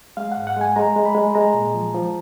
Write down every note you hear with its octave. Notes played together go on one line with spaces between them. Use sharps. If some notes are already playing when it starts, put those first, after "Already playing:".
G#3 F5
F#5
G#2
F#5
G#3 G#5
G#3 A#5
G#3
B5
G#3
G#3 A#5
A#2
F3
F3